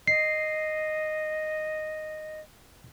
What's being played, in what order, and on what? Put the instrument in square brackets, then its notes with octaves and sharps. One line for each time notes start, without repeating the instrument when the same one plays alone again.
[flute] D#5 [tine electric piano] C7